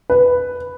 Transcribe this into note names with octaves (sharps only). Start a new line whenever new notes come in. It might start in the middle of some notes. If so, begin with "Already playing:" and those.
B4